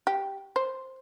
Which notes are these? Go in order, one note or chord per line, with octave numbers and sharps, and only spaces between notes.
G4
C5